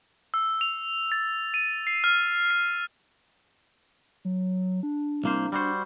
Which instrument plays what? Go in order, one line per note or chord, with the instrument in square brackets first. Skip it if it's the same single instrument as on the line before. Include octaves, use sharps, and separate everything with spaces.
[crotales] E6
F7
A6
D#7
C7
F6
C7
[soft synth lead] F#3
D4
[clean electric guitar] C2 A#3 C5
G3 F#4 C5